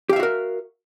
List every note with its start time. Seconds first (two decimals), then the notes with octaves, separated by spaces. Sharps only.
0.09 G4
0.13 F5
0.16 E5
0.19 F#4
0.23 A#4